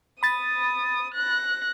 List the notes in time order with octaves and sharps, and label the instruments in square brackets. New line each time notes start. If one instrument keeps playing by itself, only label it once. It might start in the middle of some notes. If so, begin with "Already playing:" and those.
[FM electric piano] B5 A6 [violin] D#6
[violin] F#6 A#6